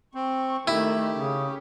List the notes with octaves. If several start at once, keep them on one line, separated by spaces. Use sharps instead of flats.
C4 C#6
D#3 A3 E4 G4
C#3 C#4